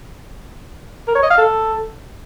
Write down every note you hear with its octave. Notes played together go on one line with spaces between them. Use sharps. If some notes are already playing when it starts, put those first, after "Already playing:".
A#4
C#5
D#5
F5
A4